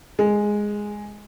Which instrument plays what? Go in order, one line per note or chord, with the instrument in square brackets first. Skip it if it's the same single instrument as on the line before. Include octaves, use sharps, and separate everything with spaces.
[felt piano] G#3